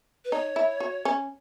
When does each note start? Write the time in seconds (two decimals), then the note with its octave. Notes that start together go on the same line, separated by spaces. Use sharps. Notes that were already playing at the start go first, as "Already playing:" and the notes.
0.25 B4
0.31 D#4 C#5
0.56 E4
0.80 F#4
1.05 C#4